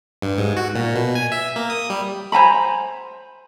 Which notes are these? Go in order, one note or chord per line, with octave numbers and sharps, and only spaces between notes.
G2
G#2
F#4
A#2
B2
G#5
E5
A#3
D#6
G3
C5 G#5 A#5 B5